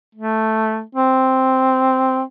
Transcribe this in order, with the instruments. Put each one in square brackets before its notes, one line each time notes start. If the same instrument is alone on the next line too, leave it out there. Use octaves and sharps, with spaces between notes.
[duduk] A3
C4